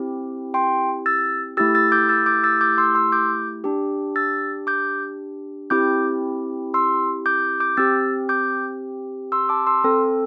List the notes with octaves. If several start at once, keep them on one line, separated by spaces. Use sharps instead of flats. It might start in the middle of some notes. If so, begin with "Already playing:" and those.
Already playing: C4 E4 G4
G5 C6
E6 A6
A3 E4 G4 E6 A6
E6 A6
D6 G6
E6 A6
D6 G6
E6 A6
D6 G6
C6 E6
C6 E6
D6 G6
D4 G4
E6 A6
D6 G6
C4 E4 G4 D6 G6
C6 E6
D6 G6
D6 G6
C4 G4 E6 A6
D6 G6
C6 E6
A5 D6
C6 E6
C4 A4